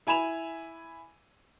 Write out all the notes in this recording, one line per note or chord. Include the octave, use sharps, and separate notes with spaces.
E4 G#5 B5 E7 F7